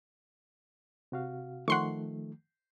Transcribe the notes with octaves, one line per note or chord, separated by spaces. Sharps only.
C3 F#4 F5
D#3 F3 A3 F#5 C6 C#6